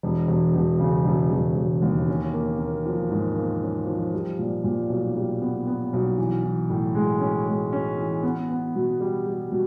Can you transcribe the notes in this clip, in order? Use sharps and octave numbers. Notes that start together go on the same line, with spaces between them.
E1
E1
E1
C#3
E1
E1
E1
D#2
C#4
A#3
A#3
F3
G#2
A#3
C#4
F3
G3
A#2
A#2
B1
G3
B3
B3
B1
E3
E3
A2
G#3
C#4
G#3
C#4
E3
B3
B3
B2
G3
G3
B2